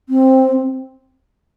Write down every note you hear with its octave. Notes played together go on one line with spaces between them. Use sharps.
C4